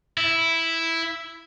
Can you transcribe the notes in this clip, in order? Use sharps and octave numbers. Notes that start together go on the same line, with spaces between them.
E4